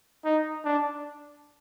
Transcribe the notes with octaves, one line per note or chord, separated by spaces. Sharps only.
D#4
D4